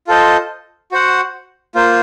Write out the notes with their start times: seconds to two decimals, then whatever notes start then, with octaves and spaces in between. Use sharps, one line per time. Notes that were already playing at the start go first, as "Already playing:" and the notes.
0.07 F4 A4 C5 D#5
0.92 F#4 C5 F#5
1.75 A#3 F4 C5